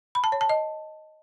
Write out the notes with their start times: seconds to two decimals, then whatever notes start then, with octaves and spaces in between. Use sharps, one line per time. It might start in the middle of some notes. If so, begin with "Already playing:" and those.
0.15 B5
0.24 A5
0.32 C#5
0.41 A5
0.49 D#5